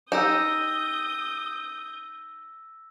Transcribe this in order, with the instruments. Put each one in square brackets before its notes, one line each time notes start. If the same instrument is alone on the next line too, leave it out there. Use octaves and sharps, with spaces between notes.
[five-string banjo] D#4 G4 [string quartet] D#6 G6 [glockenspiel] E6 A#6 E7